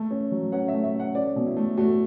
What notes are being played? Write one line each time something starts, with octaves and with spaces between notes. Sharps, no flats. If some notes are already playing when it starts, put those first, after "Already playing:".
Already playing: A3
C#4
F#3
C#4 F#5
E5
A3
E5
C#4
F#5
C#4 D5
B2
E4
A3
A3 F#4